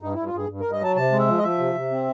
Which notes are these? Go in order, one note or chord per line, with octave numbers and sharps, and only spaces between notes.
G2 D#4
G2 E4
F4
G2 G#4
G2
G2 A#4
D#5
F#3 A5
C3 A5
G#3
E5
F3
D#5
F3 E5
C3
C3
C4